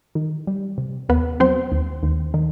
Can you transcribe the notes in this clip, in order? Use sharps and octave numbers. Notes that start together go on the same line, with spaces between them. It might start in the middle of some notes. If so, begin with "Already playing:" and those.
D#3
G3
C3
D#2 B3 B4
F#3 C4 C5
D#2
D#2
D#3